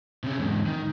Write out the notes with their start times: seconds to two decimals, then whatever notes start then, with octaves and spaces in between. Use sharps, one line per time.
0.24 C3 C#4
0.39 E2 G#2
0.66 D#3